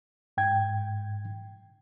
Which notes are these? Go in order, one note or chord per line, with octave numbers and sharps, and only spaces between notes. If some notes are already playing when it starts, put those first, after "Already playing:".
G#2 G5 G#6